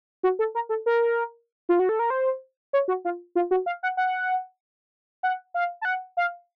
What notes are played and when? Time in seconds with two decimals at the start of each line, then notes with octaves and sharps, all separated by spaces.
0.23 F#4
0.39 A4
0.55 A#4
0.69 A4
0.86 A#4
1.69 F4
1.79 F#4
1.89 A4
1.99 A#4
2.10 C5
2.73 C#5
2.88 F#4
3.05 F4
3.35 F4
3.51 F#4
3.66 F5
3.83 F#5
3.97 F#5
5.23 F#5
5.54 F5
5.81 A5
5.85 F#5
6.17 F5